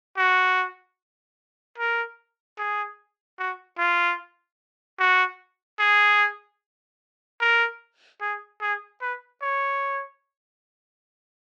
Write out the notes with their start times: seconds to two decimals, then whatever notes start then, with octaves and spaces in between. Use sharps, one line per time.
0.17 F#4
1.78 A#4
2.58 G#4
3.39 F#4
3.78 F4
4.99 F#4
5.79 G#4
7.41 A#4
8.21 G#4
8.61 G#4
9.01 B4
9.42 C#5